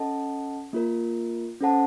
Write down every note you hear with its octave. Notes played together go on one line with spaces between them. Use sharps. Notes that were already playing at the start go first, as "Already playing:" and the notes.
Already playing: C#4 A4 D#5 F#5 A5
A#3 F4 A#4
C#4 A4 C5 F#5 A5